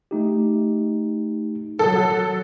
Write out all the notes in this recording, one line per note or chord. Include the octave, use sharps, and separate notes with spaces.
A3 D#4 G4
F#3 A4